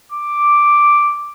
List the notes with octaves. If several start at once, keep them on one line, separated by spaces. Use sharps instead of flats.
D6